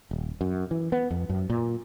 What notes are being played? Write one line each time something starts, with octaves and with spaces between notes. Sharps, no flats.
D#1
F#2
E3
B3
F2
F#2
A#2